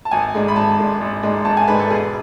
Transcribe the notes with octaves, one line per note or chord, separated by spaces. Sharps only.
A5
G#1 G#5
G#2 G#3 D4
B5
G#1 A5
G#2 G#3 D4
G#1
G#2 G#3 D4
G#1 A5
G#5
G#2 G#3 D4 B4
A4
E1 G#4